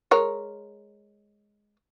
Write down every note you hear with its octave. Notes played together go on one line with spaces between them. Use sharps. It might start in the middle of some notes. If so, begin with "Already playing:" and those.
G#3 A#4 C#5